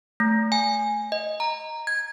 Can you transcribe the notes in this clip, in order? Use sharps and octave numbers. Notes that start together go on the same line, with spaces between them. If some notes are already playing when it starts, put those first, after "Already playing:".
A3
G#5
D#5
A#5
G#6